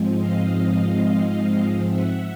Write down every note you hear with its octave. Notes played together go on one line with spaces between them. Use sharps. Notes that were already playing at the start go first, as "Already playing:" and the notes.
Already playing: G#2 F3 G#3 C4
D#5 F5
E5 F#5